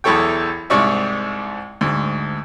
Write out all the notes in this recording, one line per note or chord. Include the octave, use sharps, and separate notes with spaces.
B1 E2 E4 A4 C#5 G5
C2 G#2 C3 C#5 D5 E5
D2 G#2